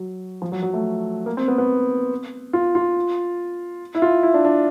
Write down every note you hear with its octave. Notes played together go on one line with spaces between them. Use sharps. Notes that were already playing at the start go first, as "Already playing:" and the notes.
Already playing: F#3
F3
F#3
F#3
A3
A#3
C4
B3
B3
F4
F4
E4
F4
E4
D4
D4